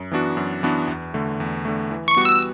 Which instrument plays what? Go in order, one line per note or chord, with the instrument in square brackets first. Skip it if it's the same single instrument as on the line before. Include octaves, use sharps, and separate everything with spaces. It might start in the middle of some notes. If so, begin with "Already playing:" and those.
Already playing: [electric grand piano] F#2
E3 B3 D4 F#4
F#2
E3 B3 D4 F#4
E2
D3 A3
E2
D3 A3
E3
[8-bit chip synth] C#6
[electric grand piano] G3 B3 F#4
[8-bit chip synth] E6